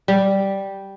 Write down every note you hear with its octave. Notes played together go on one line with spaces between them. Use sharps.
G3